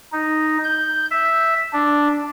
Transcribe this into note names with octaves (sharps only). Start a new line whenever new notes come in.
D#4
G6
E5
D4